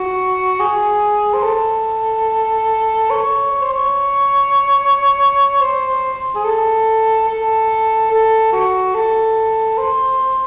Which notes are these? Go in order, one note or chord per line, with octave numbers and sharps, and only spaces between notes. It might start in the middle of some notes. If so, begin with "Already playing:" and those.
Already playing: F#4
G#4
C5
A4
C#5
C#5
C5
C#5
C5
G#4
A4
A4
A4
F#4
A4
C5